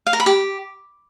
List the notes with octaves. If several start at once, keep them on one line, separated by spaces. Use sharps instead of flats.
F5
A#4
B5
G4